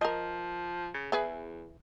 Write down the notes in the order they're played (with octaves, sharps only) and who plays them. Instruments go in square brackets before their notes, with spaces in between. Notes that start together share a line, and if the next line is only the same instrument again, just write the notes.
[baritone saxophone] F3 [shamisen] A#4 D#5
[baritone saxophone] C#3
[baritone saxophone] E2 [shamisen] E3 G#4 B4